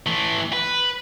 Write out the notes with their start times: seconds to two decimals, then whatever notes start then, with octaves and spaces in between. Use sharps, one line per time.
0.07 E3 A3
0.53 B4